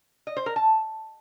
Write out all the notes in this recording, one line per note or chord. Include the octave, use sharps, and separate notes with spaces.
D#5
C5
A#4
A5